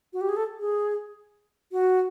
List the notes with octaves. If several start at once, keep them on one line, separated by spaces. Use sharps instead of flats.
F#4
G4
G#4
A4
G#4
F#4